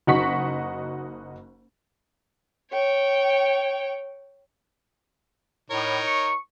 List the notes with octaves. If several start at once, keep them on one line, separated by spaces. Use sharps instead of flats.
F#1 D#4 F#4 F#5 C#6 B6
C#5 G5
A2 D#4 A#4 C#5
C#6